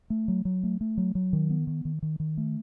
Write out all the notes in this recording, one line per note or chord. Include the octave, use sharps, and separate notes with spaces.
A3
F#3
F#3
A3
A3
F#3
F#3
D#3
B3
D#3
D#3
D#3
D#3
A3